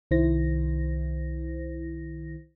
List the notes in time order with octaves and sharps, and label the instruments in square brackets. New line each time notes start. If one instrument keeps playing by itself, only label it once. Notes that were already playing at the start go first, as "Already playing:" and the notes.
[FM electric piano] C2 D#3 E4 C5 A#6